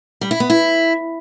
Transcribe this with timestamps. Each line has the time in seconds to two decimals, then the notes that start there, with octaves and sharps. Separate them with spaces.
0.21 G3
0.31 E4
0.40 B3
0.50 E4